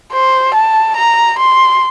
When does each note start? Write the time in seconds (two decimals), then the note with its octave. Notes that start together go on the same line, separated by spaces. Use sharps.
0.13 C5
0.55 A5
0.97 A#5
1.39 C6